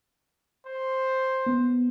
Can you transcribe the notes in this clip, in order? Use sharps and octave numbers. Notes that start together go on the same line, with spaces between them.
C5
B3